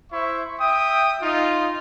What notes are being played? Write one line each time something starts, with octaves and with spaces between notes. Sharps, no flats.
E4 C5 E5 C#6
E5 G5 D#6
D#4 F4